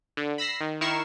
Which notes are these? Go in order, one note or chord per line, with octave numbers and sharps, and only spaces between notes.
D3
B5 E6 A#6 C7
D#3
D#3 E4 A#4 C#6 C7 E7